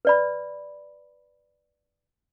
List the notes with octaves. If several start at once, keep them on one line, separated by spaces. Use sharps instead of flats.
B4 D5 B5